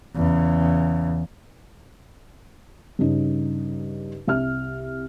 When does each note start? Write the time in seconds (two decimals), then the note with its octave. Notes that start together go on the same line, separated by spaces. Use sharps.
0.15 E2 C#3
2.99 G2 C#3 D#4
4.27 C2 E5 F6